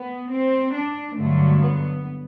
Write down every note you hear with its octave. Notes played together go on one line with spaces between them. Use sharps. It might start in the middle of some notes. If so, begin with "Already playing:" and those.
Already playing: B3
C4
D4
G2 D3 F#3 A3
B3